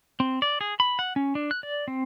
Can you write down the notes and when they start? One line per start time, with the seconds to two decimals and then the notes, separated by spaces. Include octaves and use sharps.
0.20 C4
0.42 D5
0.61 G#4
0.80 B5
0.99 F#5
1.16 C#4
1.35 D4
1.51 F#6
1.63 D5
1.88 C4